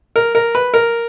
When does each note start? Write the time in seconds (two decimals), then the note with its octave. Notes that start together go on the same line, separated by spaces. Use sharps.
0.16 A#4
0.35 A#4
0.55 B4
0.74 A#4